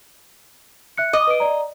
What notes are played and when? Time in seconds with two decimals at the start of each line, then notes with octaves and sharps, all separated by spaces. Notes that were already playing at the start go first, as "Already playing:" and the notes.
0.98 E5 F#6 C#7
1.13 D#5 D6
1.27 B4 D7
1.40 D5 A#5